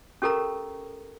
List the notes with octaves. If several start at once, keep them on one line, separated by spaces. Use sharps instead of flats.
C#4 G4 A4 A#4 A#5